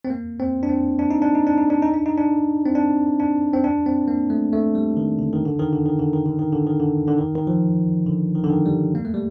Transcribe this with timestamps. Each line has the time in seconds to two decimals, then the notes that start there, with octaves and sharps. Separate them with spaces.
0.05 C4
0.10 A#3
0.40 C4
0.63 D4
0.69 C4
0.99 D4
1.11 D#4
1.22 D4
1.35 D#4
1.47 D4
1.58 D#4
1.70 D4
1.82 D#4
1.94 D4
2.06 D#4
2.18 D4
2.66 C4
2.75 D4
3.20 D4
3.53 C4
3.64 D4
3.86 C4
4.08 A#3
4.30 A3
4.53 A3
4.75 G3
4.97 D#3
5.19 D3
5.32 D#3
5.46 D3
5.59 D#3
5.73 D3
5.86 D#3
5.99 D3
6.13 D#3
6.26 D3
6.39 D#3
6.52 D3
6.66 D#3
6.80 D3
7.07 D3
7.18 D#3
7.36 D#3
7.47 F3
8.06 D3
8.35 D#3
8.44 D3
8.50 D#3
8.66 G3
8.95 A#3
9.05 A3
9.14 G3